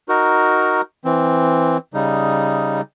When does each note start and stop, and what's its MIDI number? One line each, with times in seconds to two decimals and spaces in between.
0.09 0.81 63
0.09 0.81 66
0.09 0.81 70
1.05 1.77 52
1.05 1.77 60
1.94 2.81 49
1.94 2.81 55
1.94 2.81 63